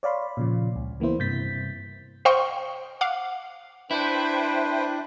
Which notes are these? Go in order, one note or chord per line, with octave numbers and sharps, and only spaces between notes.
C#5 D5 F5 B5 C6
A#2 C#3 F3
C#2
E3 A#3 B3 E4 C5
G2 C3 G6 A6 B6
C5 D#5 F5 G5 C6 C#6
F5 F#5 D6
D4 E4 B4 C5 G5